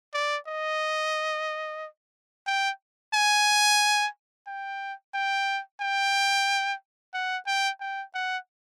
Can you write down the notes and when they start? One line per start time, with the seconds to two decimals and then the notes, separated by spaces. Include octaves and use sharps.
0.14 D5
0.47 D#5
2.47 G5
3.14 G#5
4.47 G5
5.14 G5
5.81 G5
7.14 F#5
7.47 G5
7.80 G5
8.14 F#5